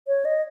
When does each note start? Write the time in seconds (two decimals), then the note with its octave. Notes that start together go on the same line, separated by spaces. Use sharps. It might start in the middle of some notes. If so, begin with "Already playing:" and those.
0.07 C#5
0.25 D#5